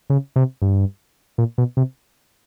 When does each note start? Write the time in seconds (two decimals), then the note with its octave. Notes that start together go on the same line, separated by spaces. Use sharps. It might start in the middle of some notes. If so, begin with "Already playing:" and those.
0.10 C#3
0.36 C3
0.62 G2
1.38 A#2
1.58 B2
1.77 C3